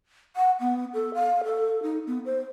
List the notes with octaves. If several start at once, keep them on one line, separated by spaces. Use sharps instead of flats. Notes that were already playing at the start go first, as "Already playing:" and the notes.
F#5
B3
A4
F5
A4
D#4
B3
C5